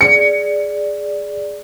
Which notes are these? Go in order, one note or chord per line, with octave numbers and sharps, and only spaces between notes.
G#4 D5 C#7